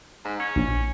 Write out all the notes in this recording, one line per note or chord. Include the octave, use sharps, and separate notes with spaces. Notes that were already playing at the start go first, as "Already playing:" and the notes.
G#2
C#4
A#1